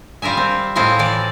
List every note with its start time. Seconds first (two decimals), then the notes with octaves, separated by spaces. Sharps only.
0.22 G3 F4 A#4 E5 G#5
0.37 C4
0.75 A2 C4 E4 F4 D#5 G#5
0.99 E3 D5